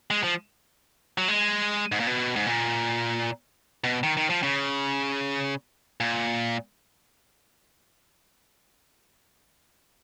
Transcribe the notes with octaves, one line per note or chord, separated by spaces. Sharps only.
G#3
F3
F#3
G#3
G#2
A#2
B2
G#2
A#2
B2
D#3
D#3
F3
C#3
A#2